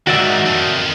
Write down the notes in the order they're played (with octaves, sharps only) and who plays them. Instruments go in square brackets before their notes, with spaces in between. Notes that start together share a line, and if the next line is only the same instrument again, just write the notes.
[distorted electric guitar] G#2 D#3 [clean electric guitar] F#4 D5 E5
[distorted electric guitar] F2 D#3